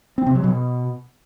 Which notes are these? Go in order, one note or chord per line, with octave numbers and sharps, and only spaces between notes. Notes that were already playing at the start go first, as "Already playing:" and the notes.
C4
C3
F#3
B2